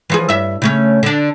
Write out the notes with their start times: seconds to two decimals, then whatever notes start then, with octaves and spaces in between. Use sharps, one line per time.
0.10 E3 F3 G#4
0.29 G2 E5
0.62 C#3 A3 C#4
1.03 D3 D4